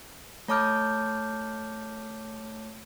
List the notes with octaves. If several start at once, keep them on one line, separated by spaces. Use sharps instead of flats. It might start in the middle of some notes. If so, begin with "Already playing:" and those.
A3 C#5 A5 D6 F6 G6